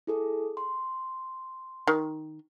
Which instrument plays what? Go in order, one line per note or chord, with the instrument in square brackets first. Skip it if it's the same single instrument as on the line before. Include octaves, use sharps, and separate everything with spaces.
[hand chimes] E4 G#4 A4
C6
[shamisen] D#3